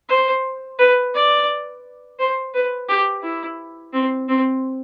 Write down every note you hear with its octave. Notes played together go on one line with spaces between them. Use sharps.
C5
B4
D5
C5
B4
G4
E4
C4
C4